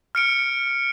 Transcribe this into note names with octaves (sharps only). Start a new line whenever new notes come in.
F6 C#7 D7